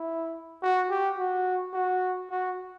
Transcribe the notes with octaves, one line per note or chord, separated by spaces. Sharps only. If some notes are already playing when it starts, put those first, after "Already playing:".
Already playing: E4
F#4
G4
F#4
F#4
F#4